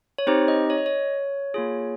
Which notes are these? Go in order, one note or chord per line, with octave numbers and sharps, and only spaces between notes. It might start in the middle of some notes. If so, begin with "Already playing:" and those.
C#5
C4 D#4 G4 C5
D#5
C#5
D#5
C#5
A#3 F4 G#4